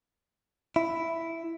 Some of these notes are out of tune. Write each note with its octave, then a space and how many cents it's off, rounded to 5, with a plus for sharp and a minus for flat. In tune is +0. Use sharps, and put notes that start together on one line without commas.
E4 +5